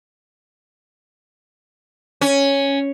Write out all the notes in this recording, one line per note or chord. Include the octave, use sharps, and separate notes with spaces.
C#4